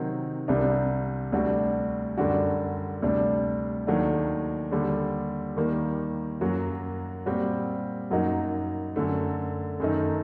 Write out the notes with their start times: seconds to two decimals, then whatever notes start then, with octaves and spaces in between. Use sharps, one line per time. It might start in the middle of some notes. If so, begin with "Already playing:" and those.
Already playing: C3 D#3 F#3 C4 D#4
0.48 C2 C3 G3 D4
1.32 D2 C3 G3 D4 F#4
2.18 F#2 D3 G3 D4 F#4
3.02 D2 C3 G3 D4
3.87 D#2 D#3 F#3 A3 D4
4.71 D#2 D3 G3
5.56 D#2 D#3 G3 A#3
6.41 F#2 F#3 A#3 F#4
7.26 A#2 G3 C4 F#4
8.10 F#2 F#3 A#3 D#4 F#4
8.96 F#2 D3 A3
9.80 F#2 D#3 A3 D#4